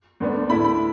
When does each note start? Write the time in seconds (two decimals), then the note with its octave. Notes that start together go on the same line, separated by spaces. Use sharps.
0.20 D2 D3 B3 D4
0.49 A2 A3 E4 B5
0.64 B5